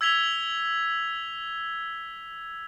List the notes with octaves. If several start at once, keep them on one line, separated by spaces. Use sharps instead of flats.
E6 G#6 B6 F7 G7